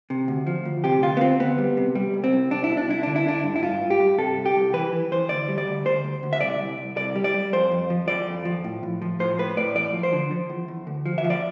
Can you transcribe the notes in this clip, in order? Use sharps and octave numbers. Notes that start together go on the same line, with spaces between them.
C3
D2
F3
D2
C3 G4
D2 F4
B3
D2 C4
D2 B3
G3
C3
G3
C2
C4
C2
C2 D4
E4
B2
D4
C2 E4
D3 D4
E4
D3 D4
G2
E4
G2 F4
G2
G4
G2
C3 A4
C2
G4
C2
E3 B4
E3
E3 C5
D2 D5
G3
D5
D2
D2 C5
D2
D2
E5
C2 D5
C2
C2
C2 D5
G3
D5
G3
F2 C5
F2
F3
F3 D5
F2
F3
A2
A2
F3
A2 C5
A2 B4
A2 D5
E2 D5
F3
C5
D3
F3
E2
E2
D2
F3
E5
F3
D5